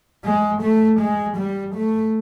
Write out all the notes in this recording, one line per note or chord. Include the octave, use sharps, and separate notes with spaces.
G#3
A3
G#3
G3
A3